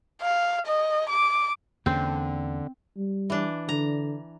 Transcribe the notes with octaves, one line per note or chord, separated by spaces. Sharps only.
F5
D#5
D6
E2 D3 A#3 C4 C#4
G3
E3 D4
D3 A#5